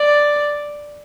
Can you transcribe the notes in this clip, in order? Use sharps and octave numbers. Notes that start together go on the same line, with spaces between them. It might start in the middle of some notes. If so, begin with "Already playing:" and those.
Already playing: D5